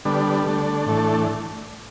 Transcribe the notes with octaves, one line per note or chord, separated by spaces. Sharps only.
D3 G3 B3 D4 A4
D3 A3 D4
A2 E3 A3 D4